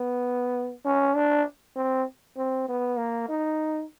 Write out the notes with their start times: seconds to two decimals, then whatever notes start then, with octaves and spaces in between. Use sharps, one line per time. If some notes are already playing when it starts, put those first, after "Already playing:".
Already playing: B3
0.85 C#4
1.16 D4
1.76 C4
2.37 C4
2.68 B3
2.98 A#3
3.29 D#4